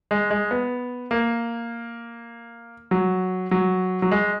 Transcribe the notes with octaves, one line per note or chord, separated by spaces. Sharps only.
G#3
G#3
B3
A#3
F#3
F#3
F#3
G#3